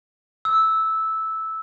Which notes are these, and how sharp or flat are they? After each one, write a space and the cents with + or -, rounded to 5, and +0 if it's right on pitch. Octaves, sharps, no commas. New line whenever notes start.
E6 -10